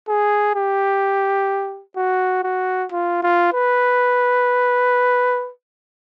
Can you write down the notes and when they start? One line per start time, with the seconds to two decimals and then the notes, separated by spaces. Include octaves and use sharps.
0.09 G#4
0.56 G4
1.97 F#4
2.43 F#4
2.92 F4
3.23 F4
3.53 B4